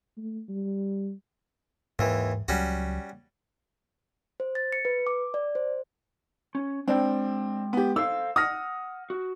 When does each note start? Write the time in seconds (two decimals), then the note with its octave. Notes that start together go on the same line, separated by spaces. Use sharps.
0.17 A3
0.49 G3
1.99 D#2 G#2 E3
2.48 C#2 F#3 G3 C#4 F#4
4.40 C5
4.55 A6
4.72 C#7
4.85 B4
5.07 D6
5.34 D5
5.55 C5
6.55 C#4
6.88 G#3 C4 D4 G5
7.73 B3 G4
7.96 A4 C5 F5 E6
8.36 F#5 D#6 F6 A#6
9.10 F#4